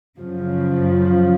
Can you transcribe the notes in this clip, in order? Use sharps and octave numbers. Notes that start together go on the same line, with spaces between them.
F#2 C#3 F3